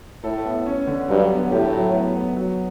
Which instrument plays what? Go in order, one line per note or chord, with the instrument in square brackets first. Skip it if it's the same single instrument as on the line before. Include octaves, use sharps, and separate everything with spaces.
[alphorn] A2 [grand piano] A4
[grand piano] B3
C#4
D3
[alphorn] G2 [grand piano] F#3
[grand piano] B3
[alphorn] A2 [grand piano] G4
[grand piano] F#3
B3
B3
F#3